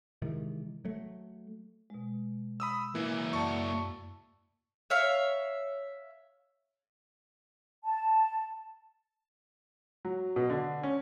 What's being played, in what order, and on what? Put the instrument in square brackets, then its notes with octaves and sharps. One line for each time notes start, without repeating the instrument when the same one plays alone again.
[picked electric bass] C3 D#3 E3 G#3
F#3 A3
[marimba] B2 G#3
[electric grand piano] B5 D#6 E6
[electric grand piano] E3 [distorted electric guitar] A#3 E4
[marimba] F#2 D5 F#5 [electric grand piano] A5 C#6
[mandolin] C#5 E5 F5
[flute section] A5
[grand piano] F#3
B2
D3
C#4